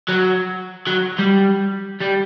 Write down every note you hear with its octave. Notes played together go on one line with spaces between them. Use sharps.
F#3
F#3
G3
G3